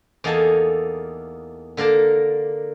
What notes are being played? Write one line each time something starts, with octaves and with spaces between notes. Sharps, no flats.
E2 A#3 D#4 A4 G#5 A5
D3 A#3 A#4 D5 A5